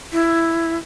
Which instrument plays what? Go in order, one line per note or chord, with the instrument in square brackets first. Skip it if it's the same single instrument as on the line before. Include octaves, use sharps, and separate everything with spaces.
[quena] E4